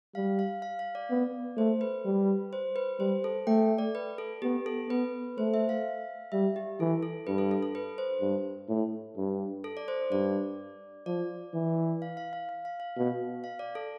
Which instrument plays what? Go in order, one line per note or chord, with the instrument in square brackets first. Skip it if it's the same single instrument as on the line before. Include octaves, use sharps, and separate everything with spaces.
[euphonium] G3 [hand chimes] F5
[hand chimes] F5
F5
F5
D5
[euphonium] B3
[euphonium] A3 [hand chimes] C5
[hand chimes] B4
[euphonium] G3
[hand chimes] C5
B4
[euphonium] G3 [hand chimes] C5
[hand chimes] A4
[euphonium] A3 [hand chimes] G5
[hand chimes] D5
B4
A4
[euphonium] B3 [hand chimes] G4
[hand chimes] A4
[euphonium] B3 [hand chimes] B4
[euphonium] A3 [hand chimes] C5
[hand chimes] E5
F5
[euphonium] G3 [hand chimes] E5
[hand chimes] G4
[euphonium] E3 [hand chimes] A4
[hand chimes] A4
[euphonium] G2 [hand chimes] B4
[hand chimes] A4
A4
A4
B4
C5
[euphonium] G2
A2
G2
[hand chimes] A4
D5
C5
[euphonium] G2 [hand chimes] D5
[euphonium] F3 [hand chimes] D5
[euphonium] E3
[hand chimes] F5
F5
F5
F5
F5
F5
[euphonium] B2
[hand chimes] F5
D5
A4